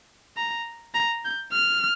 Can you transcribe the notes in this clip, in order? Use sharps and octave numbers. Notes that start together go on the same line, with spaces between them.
A#5
A#5
G6
F6